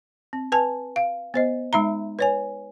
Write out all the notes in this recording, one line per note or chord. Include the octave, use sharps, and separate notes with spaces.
C4
B4 G#5 A5
F5
B3 C5 D#5
G#3 D#4 E5 A#5
B4 C#5 G#5